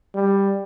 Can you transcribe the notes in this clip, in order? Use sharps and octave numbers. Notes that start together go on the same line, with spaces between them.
G3